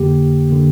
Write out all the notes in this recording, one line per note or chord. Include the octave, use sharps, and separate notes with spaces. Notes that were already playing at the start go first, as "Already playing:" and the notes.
Already playing: F2 D3 A#3 G4
D3 A#3